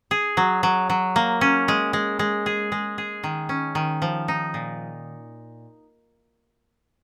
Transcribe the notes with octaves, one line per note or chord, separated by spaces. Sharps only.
G#4
F#3
F#3
F#3
A#3
C#4
G#3
G#3
G#3
G#4
G#3
G#4
D#3
C#4
D#3
F3
D#4
A#2